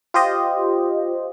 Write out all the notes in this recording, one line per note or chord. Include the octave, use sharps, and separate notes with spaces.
F4 G4 C5 D#5